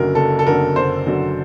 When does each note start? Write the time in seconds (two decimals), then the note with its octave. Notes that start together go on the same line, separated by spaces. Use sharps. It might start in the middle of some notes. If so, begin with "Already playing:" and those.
Already playing: F#1 F#2 D3 F#3 A#4
0.15 F#1 A4
0.39 A4
0.47 F#2 D3 F#3 A#4
0.76 F#1 C5
1.06 F#2 D3 F#3